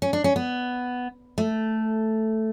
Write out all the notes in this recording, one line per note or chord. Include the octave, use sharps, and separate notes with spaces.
C#4
D4
C#4
B3
A3